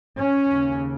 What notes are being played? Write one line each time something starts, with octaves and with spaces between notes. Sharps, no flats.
C#4
D#2 C#3